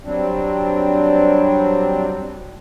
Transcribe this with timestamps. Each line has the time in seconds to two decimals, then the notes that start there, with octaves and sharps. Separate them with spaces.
0.04 F#3 G3 C4 D4